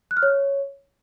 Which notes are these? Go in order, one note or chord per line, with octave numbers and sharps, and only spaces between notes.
F#6
F6
C#5